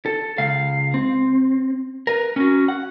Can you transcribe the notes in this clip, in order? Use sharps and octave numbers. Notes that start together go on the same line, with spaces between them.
A4
C#2 F5
C4
A#4 B4
C#4 F#4
F#5